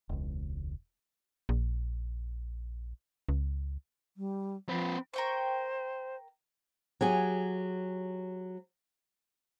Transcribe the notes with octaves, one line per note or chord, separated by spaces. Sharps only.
E1 C#2
A#1
C#2
G3
F3 C4 B4
A#4 C5 G5 C#6
F#3 G4 G#4